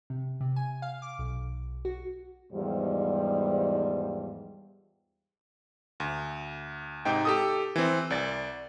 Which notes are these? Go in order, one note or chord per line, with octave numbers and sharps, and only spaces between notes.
C3
C3
G#5
F5
D6
B1
F#4
E2 G#2 F3 G3
D2
G#2 C3 D#4 G5
G4 A4 D#6
E3 C4
C2 D5 A6